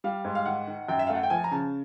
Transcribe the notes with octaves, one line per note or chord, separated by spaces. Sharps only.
G3 F5
G#2
F5
D#3 F#5
D#3
F#2 G5
E5
F5
A3 F#5
G5
F3 G#5
A#5
C#3 A5